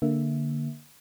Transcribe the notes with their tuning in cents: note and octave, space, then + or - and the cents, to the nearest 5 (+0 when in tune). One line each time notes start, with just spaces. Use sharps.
D3 +0 A#3 +0 E5 +0